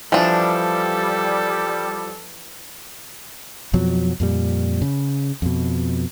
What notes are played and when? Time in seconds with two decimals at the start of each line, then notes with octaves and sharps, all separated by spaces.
0.12 E3 F3 G3 D4 A4
3.73 F2 B2 F3 F#3
4.20 F2 A#2 G3
4.82 C#3
5.42 F2 B2